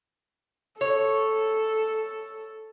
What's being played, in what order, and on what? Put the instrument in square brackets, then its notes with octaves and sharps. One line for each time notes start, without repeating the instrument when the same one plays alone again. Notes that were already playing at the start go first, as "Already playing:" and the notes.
[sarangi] A4 [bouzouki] C#5